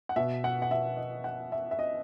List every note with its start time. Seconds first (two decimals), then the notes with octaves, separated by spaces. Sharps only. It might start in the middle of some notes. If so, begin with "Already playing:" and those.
0.09 F#5
0.16 B2 E5
0.44 F#5
0.62 F#5
0.71 E5
0.97 D#5
1.24 F#5
1.52 E5
1.71 E5
1.79 D#5